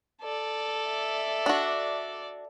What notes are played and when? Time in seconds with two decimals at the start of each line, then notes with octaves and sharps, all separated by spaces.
0.22 A4 D5
0.89 E5
1.46 D4 F#4